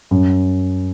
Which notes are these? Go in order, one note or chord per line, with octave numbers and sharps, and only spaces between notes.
F#2